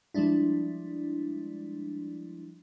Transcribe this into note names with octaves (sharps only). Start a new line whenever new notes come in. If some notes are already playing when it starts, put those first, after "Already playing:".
F3 G3 G#3 D4 E4